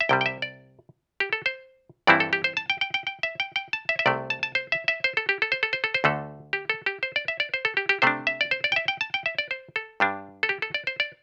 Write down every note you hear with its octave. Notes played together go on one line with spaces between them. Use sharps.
E5
C2 C3 G3 G5
G5
E5
D5
G4
A4
C5
G2 E3 G3 C4 E4 D5
A4
G4
C5
A5
G5
G5
G5
G5
E5
G5
G5
A5
E5
E5
C2 C3 A3 D5
A5
A5
C5
E5
E5
C5
A4
G4
A4
C5
A4
C5
A4
C5
D2 D3 A3 A4
G4
A4
G4
C5
D5
E5
D5
C5
A4
G4
G4
C3 A3 D4 C5
E5
D5
C5
D5
G5
E5
G5
A5
G5
E5
D5
C5
A4
G2 G3 D4
A4
G4
A4
D5
C5
D5